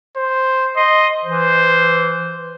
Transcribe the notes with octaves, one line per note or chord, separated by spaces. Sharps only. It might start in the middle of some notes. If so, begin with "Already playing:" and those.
C5
D#5 C6
E3 C5